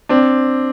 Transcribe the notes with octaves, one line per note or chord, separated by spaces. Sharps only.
C4 D4